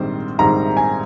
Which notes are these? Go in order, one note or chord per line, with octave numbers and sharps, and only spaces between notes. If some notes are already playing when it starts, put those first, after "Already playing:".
Already playing: A#1 G#2 D#3 G3 C4 C5
A#1 G#2 D#3 G3 C4 A#5
G#5